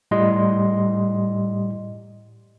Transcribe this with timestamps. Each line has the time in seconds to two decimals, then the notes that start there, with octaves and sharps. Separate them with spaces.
0.11 A2 G3 D#5 C6